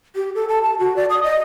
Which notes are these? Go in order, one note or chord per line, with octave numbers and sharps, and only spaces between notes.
G4
A4
A5
A5
F#4
D5
D#6
D#5